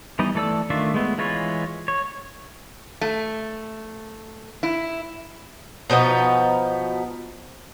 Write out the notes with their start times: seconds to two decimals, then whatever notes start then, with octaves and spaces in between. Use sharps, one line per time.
0.19 E3 G3 B3 D#4 D#5
0.35 E3 A3 A4 D5 E6
0.70 D#3 A3 D4 F4 E5
0.94 G#3 A3 B3
1.18 E3 G#3 F4 B4 C#5
1.88 C#5
3.01 A3
4.63 E4
5.90 B2 F3 B3 D#4